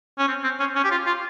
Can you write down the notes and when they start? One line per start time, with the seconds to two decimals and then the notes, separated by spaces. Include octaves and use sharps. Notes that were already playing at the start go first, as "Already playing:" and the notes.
0.19 C#4
0.28 C4
0.44 C4
0.60 C#4
0.76 C#4
0.85 G4
0.91 F4
1.06 F4